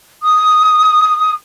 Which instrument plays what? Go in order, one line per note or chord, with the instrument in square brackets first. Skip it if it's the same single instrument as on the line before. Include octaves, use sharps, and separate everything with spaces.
[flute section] D#6